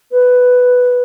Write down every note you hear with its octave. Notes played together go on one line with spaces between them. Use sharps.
B4